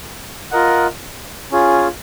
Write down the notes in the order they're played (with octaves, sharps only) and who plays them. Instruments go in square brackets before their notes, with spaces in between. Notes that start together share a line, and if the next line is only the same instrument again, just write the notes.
[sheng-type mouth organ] F4 A#4 D#5 F#5
C#4 F4 G#4